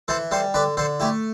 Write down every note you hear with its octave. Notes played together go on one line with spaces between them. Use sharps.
E3 A4 C5
G3 A4 C5
D3 B4 D5
D3 A4 C5
A3 E4 G4